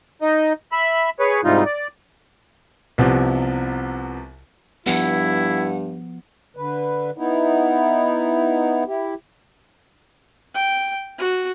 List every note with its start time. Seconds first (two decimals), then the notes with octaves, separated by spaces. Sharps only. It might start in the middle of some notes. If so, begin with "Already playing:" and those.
0.22 D#4 D#5
0.72 E5 B5
1.20 G#4 B4 C#5
1.44 G#2 C3 E3 G3 D#4 F4
1.65 D5
2.98 C2 C3 F3 B3
4.86 G2 F3 B3 E4 F#5
6.57 D3 B4
7.17 B3 D#4 E4
8.87 E4 G4
10.55 G5
11.18 F#4